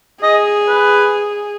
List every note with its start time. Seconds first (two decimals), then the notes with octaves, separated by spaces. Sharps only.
0.22 G#4 D#5
0.68 B4